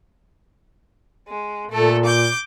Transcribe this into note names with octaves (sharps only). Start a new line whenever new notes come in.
G#3
A#2 A3 A4
D6 G6